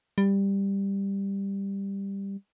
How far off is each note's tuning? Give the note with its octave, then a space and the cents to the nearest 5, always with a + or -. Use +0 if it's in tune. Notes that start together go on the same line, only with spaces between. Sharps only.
G3 +10